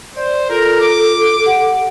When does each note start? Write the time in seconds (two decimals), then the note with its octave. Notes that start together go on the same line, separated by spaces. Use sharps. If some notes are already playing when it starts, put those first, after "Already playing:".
0.16 C5 D5
0.49 F4 A4 A#4
0.81 D6
1.45 G4 F#5